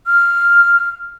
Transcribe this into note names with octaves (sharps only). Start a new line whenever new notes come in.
F6